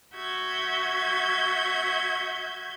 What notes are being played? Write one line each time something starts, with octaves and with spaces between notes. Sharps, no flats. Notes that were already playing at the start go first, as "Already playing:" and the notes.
F#4 E5 G6 G#6